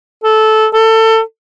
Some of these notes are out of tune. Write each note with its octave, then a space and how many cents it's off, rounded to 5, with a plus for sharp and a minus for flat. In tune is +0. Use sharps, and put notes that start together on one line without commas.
A4 -15
A4 +25